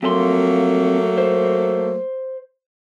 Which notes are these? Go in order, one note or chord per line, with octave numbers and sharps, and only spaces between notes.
F2 F#3 A3 A#3 A4 C6
C5